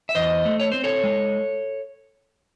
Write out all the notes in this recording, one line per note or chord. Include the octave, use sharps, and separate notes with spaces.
E5
E2 C5 D#5
A3
C#5
C4 C5
A4 C#5
G#3